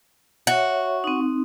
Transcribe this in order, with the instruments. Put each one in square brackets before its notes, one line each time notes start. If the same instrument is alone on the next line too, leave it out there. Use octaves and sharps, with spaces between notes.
[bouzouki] F#4 [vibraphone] C#5 E5
[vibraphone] C4 D#4